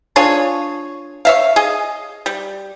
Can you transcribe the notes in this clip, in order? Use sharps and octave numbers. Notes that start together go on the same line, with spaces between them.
D4 F4 G#4 C#5
C#5 E5 F5
G#4 D#5
G3